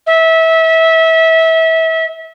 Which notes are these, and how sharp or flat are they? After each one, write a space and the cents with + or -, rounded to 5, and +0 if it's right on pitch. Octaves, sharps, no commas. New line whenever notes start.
E5 -25